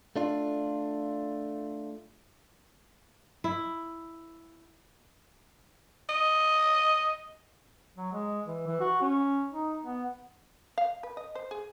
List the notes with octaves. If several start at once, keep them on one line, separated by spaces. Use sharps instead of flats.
A3 D4 F4
E4
D#5
F#3
G#3
E3
E3
F#4
C#4
D#4
B3
F5
B4
D#5
C5
G#4